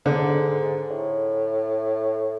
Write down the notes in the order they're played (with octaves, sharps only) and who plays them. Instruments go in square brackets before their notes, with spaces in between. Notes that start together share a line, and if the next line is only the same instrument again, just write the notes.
[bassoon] G#2 [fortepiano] D3
[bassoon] A2